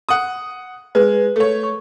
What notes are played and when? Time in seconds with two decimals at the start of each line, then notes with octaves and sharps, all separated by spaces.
0.09 F#5 D#6
0.95 G#3 B4
1.36 A3 C#5
1.63 C#6